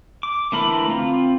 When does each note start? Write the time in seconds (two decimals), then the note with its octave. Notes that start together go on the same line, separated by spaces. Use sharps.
0.23 D6
0.52 D3 E3 A3 A#4 B5
0.90 C4 F4